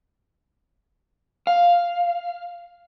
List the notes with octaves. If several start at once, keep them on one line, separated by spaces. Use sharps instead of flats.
F5